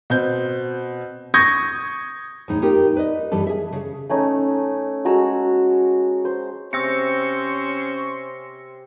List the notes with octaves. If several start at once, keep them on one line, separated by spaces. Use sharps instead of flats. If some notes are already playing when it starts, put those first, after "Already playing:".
B2 C4 G6
C#6 D#6 G6 G#6 A#6
E2 A2 D#4
D#4 F4 G4 A#4
B4 D5 D#5
G2 E3 G3 A4
G#4 E5
C#3
A3 C#4 D#4
G#3 F#4 A#5 E6
C5
C3 C#4 C5 C6 C#6 E6 A#6 C#7